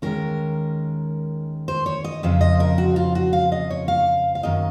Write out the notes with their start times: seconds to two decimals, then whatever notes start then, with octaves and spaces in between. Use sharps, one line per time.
0.02 D#2 D#3 G#3 C#4 A#4
1.68 C5
1.86 C#5
2.04 D#5
2.23 F2 C#3 F3 C4
2.41 D#5
2.60 A#4
2.78 F#4
2.96 F4
3.15 F#4
3.33 F5
3.52 D#5
3.70 C#5
3.88 F5
4.35 F5
4.43 F#2 D#3 A#3 D#5